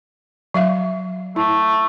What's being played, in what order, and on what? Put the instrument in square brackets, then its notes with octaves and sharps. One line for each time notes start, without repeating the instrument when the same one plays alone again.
[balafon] F#3 E5 F5
[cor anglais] A3 [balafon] E4